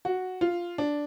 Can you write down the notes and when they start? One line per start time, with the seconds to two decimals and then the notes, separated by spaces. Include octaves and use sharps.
0.05 F#4
0.41 F4
0.78 D4